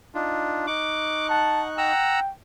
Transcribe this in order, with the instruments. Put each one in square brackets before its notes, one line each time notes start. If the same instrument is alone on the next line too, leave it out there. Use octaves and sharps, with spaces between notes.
[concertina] D4 [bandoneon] D#4 F4
[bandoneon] D#4 C#6 F#6 [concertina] D6
[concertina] F#5 [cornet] A5
[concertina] F#5 A#5 E6 [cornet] G5